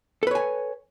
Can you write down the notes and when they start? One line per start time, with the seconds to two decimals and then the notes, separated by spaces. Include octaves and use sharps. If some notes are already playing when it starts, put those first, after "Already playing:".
0.23 A4
0.27 B4
0.31 C#5
0.35 G#5